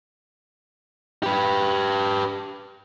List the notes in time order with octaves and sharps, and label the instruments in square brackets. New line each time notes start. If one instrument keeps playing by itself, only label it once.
[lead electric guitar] G4 B4